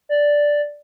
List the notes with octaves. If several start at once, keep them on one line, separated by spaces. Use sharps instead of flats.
D5